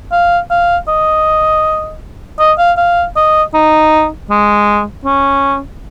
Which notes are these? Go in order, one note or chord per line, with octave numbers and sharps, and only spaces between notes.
F5
F5
D#5
D#5
F5
F5
D#5
D#4
G#3
C#4